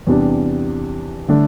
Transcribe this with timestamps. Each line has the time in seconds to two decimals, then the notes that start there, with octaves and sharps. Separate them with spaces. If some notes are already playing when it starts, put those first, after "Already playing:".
0.07 E2 C3 G3 D4
1.28 D3 A3 D4